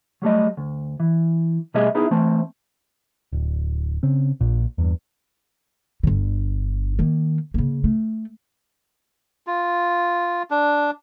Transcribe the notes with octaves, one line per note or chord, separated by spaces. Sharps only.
F#3 G3 A3 D#5
D2
E3
B2 G3 A3 G#4 D#5 E5
B3 D#4 E4 G#4
E3 A3 C4 C5 A5
D1
C#3 C4
A#1 A#2
E2 G2
G1 D3
D#3 A#3
C#3 A#3
A3
F4
D4